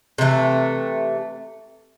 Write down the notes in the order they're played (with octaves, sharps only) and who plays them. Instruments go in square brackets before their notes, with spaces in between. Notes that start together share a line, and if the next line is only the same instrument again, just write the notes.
[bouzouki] C3 E3 A3